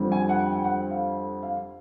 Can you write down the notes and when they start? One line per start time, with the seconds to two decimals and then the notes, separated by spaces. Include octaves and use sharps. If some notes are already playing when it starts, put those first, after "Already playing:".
Already playing: F2 D3 G3
0.12 G#5
0.29 F#5
0.39 G5
0.53 G5
0.64 F#5
0.91 F5
1.43 F5